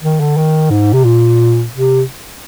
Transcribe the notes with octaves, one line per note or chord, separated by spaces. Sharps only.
D#3
D3
D#3
G#2
C3
A#2
C3